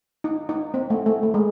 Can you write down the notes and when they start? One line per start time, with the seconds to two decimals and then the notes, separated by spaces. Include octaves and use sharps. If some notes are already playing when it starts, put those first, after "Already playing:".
0.24 D#4
0.49 D#4
0.74 C4
0.90 A3
1.06 A3
1.23 A3
1.34 G#3